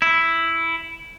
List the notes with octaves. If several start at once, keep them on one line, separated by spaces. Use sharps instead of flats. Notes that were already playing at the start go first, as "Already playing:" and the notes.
E4